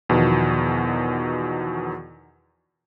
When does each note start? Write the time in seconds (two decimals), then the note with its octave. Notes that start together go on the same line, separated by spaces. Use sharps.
0.09 E2 B2 D#3 F3